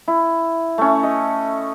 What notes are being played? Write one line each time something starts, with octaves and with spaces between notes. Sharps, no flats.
E4
A3 C#4
D#5